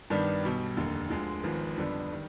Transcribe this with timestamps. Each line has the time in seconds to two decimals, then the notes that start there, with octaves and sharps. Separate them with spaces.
0.10 G2 D#3 G3 B3 D4
0.43 B1 B2 G3
0.77 F1 D#2 D3
1.10 D2 D3 F3 G#3
1.44 G#1 G#2 F3 B3
1.77 F2 D3 G3 B3 D4
2.12 D#3 G3